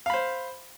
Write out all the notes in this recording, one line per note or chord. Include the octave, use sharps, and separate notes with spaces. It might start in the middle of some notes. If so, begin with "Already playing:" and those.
C5 F5 B5